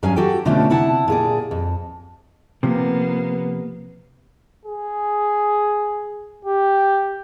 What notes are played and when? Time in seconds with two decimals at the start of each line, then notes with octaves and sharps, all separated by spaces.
0.03 G2 F#3 C#4 G#4 F5 G#5
0.16 F#4 G4 A4 G5
0.45 B2 D3 F3 A3 C#4 D4
0.70 C3 E4 F#5 A5
1.08 A#2 G#4 D5
1.51 F2
2.63 C3 F3 A#3 B3
4.65 G#4
6.45 G4